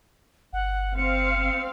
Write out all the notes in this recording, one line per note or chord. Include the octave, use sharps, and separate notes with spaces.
G1 F#5
C4 F5 C#7